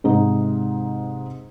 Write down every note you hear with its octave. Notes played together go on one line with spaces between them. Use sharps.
G#2 C3 D#4